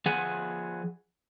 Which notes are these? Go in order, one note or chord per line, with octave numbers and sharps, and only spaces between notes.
F3 G#4 F#5 G#5